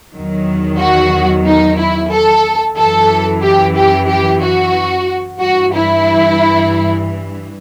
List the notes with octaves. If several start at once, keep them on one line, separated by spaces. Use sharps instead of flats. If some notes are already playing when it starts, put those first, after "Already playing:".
E2 D#3 F#3
F#4
D#4
E4
A4
F#2 E3 A4
G4
G4
G4
F#4
G2 E3 F#4
E4